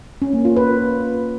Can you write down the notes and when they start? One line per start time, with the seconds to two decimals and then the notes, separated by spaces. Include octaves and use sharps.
0.22 C#4
0.33 A#3
0.45 F4
0.57 B4